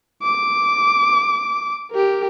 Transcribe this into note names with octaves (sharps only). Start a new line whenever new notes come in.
D6
G4 A#4